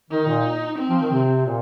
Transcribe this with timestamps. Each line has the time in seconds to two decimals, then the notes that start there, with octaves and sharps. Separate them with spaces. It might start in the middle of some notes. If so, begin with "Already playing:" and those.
0.11 D#3 D#4
0.27 A#2
0.78 C4
0.89 F3
1.02 D#3
1.12 C3
1.46 A#2